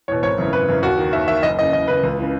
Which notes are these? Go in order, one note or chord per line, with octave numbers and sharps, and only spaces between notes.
E2 B2 C#5
G#1 C#5
F#2 C#3 E3
G#1 B4
F#2 C#3 E3
D#2 F#4
D#3
D#2 E5
D#3 E5
F#1 D#5
E2 C#3 D#5
F#1 D#5
E2 C#3 B4
C#2
C#3 E3